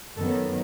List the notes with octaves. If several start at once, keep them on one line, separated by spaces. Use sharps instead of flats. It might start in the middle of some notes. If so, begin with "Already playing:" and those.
F#2 D#3 F#3 B3 A4